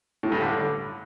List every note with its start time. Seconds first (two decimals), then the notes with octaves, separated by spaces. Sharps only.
0.23 A2
0.32 G2
0.41 D3